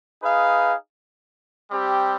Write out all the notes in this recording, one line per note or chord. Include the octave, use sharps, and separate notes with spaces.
D#4 G#4 B4 F5
G3 C4 G4